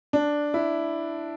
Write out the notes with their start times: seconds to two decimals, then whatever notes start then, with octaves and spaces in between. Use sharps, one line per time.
0.13 D4
0.54 E4